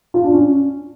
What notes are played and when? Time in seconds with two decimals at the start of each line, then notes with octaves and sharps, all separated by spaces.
0.14 F4
0.24 D4
0.34 C#4